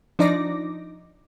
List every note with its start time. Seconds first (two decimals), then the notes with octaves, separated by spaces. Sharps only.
0.19 F3 D4 D#4 D5 D6 A#6